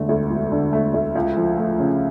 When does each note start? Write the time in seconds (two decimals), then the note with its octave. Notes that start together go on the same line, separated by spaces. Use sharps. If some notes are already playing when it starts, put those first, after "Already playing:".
Already playing: E1 D3 A3
0.09 D2
0.30 E1
0.52 D3
0.73 A3
0.94 D2
1.15 C#2
1.37 F3
1.58 A3
1.79 C#3